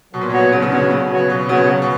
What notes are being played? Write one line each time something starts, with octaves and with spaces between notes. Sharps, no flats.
B2 F#3
A#2
B2 B3 F#4 C#5
C#3 F#3
C#3
D3 B3 F#4 C#5
C#3 F#3
B3 F#4 C#5
B2 F#3
C#3 B3 F#4 C#5
F#3
B2